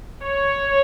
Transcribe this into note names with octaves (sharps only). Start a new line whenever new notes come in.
C#5